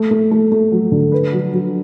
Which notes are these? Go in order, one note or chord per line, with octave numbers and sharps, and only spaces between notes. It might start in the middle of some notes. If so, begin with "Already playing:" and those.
Already playing: A3
A3
A3
A3
F#3
D3
B4
F#3
F#3